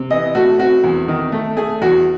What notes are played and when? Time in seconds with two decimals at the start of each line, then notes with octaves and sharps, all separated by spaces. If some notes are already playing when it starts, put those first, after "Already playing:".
Already playing: C3
0.11 E3 D#5
0.35 A3 F#4
0.59 C4 F#4
0.84 E2
1.08 D#3
1.32 A3
1.57 A3 G#4
1.82 E2 F#4